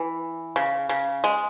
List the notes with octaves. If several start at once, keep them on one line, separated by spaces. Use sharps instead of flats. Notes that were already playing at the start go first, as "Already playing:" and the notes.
Already playing: E3
C#3
C#3
G#3